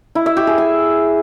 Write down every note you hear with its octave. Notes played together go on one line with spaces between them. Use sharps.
E4
E5
G4
G#4
G#5